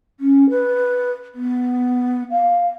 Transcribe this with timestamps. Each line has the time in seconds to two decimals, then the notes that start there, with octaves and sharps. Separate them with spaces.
0.20 C#4
0.50 B4
1.34 B3
2.31 F5